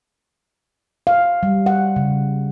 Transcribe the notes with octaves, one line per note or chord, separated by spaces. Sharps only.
F5
G3
F#5
C#3